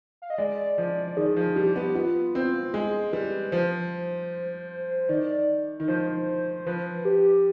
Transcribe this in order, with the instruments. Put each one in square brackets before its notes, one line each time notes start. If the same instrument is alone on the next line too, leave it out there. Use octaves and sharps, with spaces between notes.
[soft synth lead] F5
D#5
[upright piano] G#3 [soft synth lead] D5
[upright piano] F3
[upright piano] D#3 [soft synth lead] G#4
[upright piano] F3
[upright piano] G3 [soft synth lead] G4
[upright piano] B3
[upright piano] B3 [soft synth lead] F4
[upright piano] C4 [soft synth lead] F4
[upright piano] G#3 [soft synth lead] G#4
[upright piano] G3 [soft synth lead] B4
[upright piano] F3 [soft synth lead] C5
[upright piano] D#3 [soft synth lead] D5
[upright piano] D#3
[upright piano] F3 [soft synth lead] C5
[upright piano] F3 [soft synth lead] B4
[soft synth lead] G4